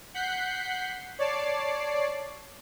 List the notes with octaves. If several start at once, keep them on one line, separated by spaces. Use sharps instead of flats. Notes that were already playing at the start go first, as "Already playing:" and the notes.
F#5 F#6 G6 B6 C7
C#5 D5 A5 D6 C7